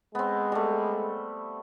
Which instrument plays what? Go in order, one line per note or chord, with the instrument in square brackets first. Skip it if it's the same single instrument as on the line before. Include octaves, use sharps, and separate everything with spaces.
[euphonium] G#3 [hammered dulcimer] B3 C4
[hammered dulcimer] G3 A3